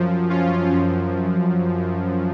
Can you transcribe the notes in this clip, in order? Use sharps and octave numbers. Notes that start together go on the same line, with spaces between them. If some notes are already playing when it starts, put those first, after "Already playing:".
Already playing: F#2 F3
C#4 F4
F#2 F3